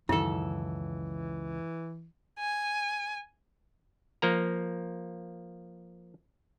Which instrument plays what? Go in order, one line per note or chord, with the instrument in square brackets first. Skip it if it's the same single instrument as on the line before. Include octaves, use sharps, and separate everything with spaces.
[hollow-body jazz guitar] C#2 A4 [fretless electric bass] F#2 D#3 [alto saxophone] E3 [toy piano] E4
[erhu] G#5
[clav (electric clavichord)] F3 A#3 A#5